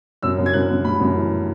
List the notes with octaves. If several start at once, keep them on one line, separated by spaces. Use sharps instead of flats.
F#2 E6
F#2
G#6
F#2 F#6
F#2
A3 B5
F#2
E3